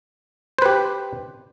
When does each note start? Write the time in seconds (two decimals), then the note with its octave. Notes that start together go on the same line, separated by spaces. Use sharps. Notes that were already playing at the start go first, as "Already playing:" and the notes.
0.59 C5
0.62 B4
0.66 G4